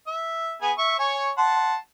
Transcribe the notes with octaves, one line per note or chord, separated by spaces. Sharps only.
E5
B3 G#4 G#5
E5 C#6
C#5 G#5 C#6
F#5 A5 C6